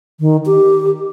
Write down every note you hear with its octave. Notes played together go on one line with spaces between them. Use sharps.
D#3
G4